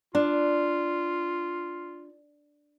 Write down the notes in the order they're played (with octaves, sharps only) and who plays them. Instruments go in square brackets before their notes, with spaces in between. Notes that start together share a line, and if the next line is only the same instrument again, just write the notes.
[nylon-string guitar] D4 [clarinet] F4